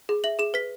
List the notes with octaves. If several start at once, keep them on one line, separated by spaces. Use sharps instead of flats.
G#4
E5 F#7
G#4 E7
B4 B6